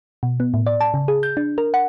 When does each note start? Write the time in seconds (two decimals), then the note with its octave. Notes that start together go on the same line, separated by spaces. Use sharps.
0.23 B2
0.40 B3
0.54 A2
0.66 D5
0.81 A5
0.94 C#3
1.08 G#4
1.23 G6
1.37 D4
1.58 A#4
1.74 F#5